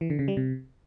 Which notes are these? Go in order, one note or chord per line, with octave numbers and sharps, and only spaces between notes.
E3
D3
C#3
G3
C3